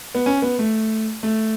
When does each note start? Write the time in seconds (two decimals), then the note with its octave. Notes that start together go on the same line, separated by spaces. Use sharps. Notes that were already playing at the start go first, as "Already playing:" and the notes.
0.15 B3
0.26 C#4
0.42 B3
0.59 A3
1.23 A3